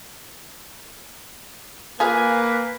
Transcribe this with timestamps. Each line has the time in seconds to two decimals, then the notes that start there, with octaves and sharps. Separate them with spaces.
2.00 A#3 F4 G#4 B4 F5 G#5